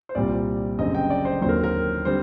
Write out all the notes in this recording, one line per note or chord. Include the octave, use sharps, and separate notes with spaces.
C5
C2 A#2 G3 C4 D5
F#1 F#2 D3 G3 C4 D#5
G5
D5
C5
D#2 D3 F#3 C4 C5
A#4
A#4
D3 G3 C4 C5